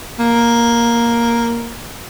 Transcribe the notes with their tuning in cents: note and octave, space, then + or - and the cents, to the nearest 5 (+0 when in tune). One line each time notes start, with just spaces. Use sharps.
A#3 +5